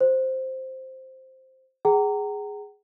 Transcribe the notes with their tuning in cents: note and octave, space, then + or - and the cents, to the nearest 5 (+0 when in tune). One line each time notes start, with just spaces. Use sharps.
F#4 -10 C5 +0
G#4 +0 F#5 +45 A#5 -20